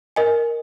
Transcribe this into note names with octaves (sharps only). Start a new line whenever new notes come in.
A#4 D#5 G#5